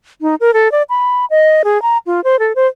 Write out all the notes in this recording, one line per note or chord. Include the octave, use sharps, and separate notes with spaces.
D#4
A#4
A4
D5
B5
D#5
G#4
A#5
F4
C5
A4
C5